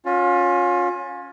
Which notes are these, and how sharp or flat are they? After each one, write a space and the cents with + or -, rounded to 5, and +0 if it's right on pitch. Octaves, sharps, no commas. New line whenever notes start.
C#4 +0 F4 +30